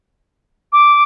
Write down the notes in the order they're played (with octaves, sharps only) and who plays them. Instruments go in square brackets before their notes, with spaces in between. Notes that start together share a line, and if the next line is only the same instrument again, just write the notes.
[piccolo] D6